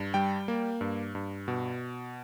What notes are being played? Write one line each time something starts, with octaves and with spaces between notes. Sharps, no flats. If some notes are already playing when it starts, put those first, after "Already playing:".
Already playing: G2
G3 G5
A#3
G2
G2
B2